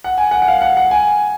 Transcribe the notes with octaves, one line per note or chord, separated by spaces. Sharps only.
F#5
G#5
F#5
F#5
F5
F#5
F#5
G#5